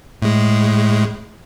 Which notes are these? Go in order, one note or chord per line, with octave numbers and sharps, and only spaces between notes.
A2 G#3